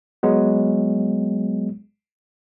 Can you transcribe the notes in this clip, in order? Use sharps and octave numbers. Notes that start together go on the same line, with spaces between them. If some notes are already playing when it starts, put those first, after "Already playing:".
F#3 G#3 B3